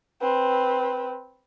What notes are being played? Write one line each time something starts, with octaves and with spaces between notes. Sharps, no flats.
C4 B4